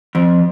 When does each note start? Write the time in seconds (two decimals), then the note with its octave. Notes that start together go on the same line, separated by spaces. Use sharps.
0.15 F2